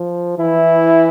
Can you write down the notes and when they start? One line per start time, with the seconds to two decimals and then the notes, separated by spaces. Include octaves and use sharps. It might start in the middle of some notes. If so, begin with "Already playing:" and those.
Already playing: F3
0.39 E3 E4